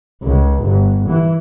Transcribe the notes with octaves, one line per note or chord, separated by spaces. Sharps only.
C#2
G1
E3